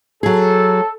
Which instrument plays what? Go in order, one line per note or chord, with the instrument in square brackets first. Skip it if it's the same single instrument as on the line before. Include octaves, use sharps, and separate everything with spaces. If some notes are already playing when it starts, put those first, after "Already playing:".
[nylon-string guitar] F#3 G#4 [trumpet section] A4